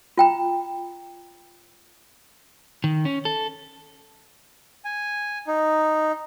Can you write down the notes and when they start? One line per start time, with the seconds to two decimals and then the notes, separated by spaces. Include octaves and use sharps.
0.18 F4 G5 A#5
2.84 D#3
3.05 C#4
3.25 A4
4.85 G#5
5.47 D#4